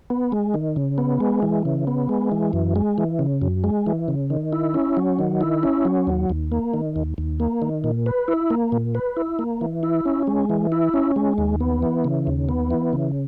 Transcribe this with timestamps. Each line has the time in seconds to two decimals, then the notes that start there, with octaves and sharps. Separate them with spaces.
0.10 B3
0.32 G#3
0.54 D#3
0.76 C#3
0.98 B3
1.20 G#3
1.42 E3
1.65 C#3
1.87 B3
2.09 G#3
2.32 E3
2.53 F#2
2.76 G#3
2.98 E3
3.19 C#3
3.42 F#2
3.64 G#3
3.86 E3
4.08 C#3
4.30 D#3
4.53 E4
4.74 C#4
4.97 F#3
5.19 D#3
5.41 E4
5.63 C#4
5.85 F#3
6.07 D#2
6.30 D#2
6.52 A#3
6.74 D#3
6.96 D#2
7.18 D#2
7.40 A#3
7.62 D#3
7.84 A#2
8.06 B4
8.28 E4
8.50 A#3
8.72 A#2
8.95 B4
9.17 E4
9.39 A#3
9.61 E3
9.83 E4
10.06 C#4
10.27 G#3
10.50 E3
10.72 E4
10.94 C#4
11.16 G#3
11.38 D#2
11.60 B3
11.82 E3
12.04 C#3
12.27 D#2
12.49 B3
12.71 E3
12.93 C#3